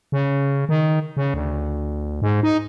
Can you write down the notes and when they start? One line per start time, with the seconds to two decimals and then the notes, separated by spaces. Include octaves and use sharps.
0.12 C#3
0.69 D#3
1.17 C#3
1.34 D2
2.22 G#2
2.43 D#4